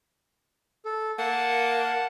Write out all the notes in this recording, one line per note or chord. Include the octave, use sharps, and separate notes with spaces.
A4
A#3 F#5 A5